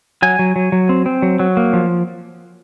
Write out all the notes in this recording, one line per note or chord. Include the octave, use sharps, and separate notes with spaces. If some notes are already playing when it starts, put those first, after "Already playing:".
F#3 G#5
F#3
F#3
F#3
C4
C4
F#3
F#3
A#3
F3